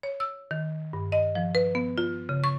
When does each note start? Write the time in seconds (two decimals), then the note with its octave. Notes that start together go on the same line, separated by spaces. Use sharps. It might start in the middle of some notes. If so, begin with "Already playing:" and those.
0.03 C#5
0.20 E6
0.51 D#3
0.93 G2
1.12 D#5
1.35 F3
1.55 B4
1.75 B3
1.98 F4
2.29 C#3
2.44 C#6